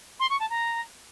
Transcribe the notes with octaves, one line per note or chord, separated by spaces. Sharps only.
C6
C#6
A5
A#5